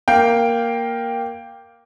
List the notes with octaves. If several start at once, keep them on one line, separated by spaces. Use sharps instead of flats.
A#3 F5 G5